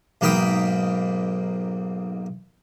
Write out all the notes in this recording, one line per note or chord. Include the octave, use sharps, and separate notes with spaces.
B1 G#2 A#3 G5 B5 D#6